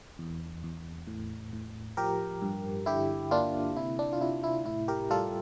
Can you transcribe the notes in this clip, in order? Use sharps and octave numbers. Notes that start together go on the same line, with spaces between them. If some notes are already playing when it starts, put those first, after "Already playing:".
E2
E2
A2
A2
F3 G4 A#4
G2
D3 E4 G4
A#3 D4 F4
C3 E4
D4
F4
C3 E4
E4
A2 E4
G4 A#4
G3 F4 A4